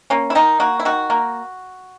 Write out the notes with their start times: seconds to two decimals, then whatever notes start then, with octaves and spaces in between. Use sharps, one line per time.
0.10 A#3 C#4
0.30 E4
0.35 D#3 D#4
0.60 A#3 F#4
0.80 E4
0.85 D#3 F#4
1.10 A#3